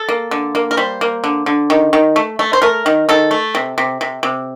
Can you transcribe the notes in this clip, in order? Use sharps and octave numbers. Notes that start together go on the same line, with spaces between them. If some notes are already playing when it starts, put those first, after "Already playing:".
Already playing: A4
A#3
D3
A#3
A#4
G3 C5
A#3
D3
D3
D#3
D#3
A3
A3
C5
A3 A#4
D#3
D#3 A4
A3
C3
C3
C3
C3